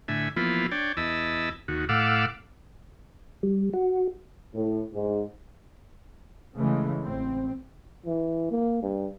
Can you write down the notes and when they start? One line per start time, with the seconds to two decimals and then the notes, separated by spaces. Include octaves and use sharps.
0.08 A2 D3 E5 G#5
0.37 E3 F3 A#3 B3 E4 F4
0.71 D4 C#5 D5 G5
0.97 E2 E4 D#5 A5 E6
1.68 D#2 F#4
1.89 A2 F5 F#5 D6 E6
3.43 G3
3.73 F#4
4.53 A2
4.93 G#2
6.58 C#3 E3 G#3 A3
7.02 A1 C4
8.06 E3
8.51 A#3
8.83 G2